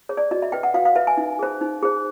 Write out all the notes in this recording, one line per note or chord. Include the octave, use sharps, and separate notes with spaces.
G#4 C5 C#5
D5
F#4 D#5
E5
B4 G5
F#5
F#4 F5
F5
B4 E5
G#5
D#4
G#4 C5
D#4
G#4 C5